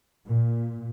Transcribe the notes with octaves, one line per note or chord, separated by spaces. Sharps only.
A#2